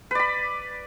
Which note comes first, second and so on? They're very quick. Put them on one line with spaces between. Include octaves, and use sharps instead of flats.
B4 D5 B5